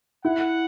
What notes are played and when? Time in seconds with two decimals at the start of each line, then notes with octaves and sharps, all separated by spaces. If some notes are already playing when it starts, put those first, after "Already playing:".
0.24 E4 F#5